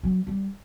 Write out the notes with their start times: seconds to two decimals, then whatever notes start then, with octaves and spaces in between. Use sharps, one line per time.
0.03 F#3
0.27 G3